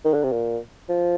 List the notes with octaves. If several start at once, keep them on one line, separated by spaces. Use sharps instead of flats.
D#3
D3
C3
A#2
F3